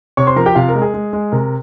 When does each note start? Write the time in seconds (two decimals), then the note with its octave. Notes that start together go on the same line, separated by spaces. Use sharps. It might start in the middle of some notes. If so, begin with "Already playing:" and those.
0.17 C3 C#5 C#6
0.27 C5 C6
0.36 F3 A#4 A#5
0.46 G4 G5
0.55 C3 F4 F5
0.69 A#4
0.75 G#3
0.82 G#4
0.94 G#3
1.13 G#3
1.32 C3 A#4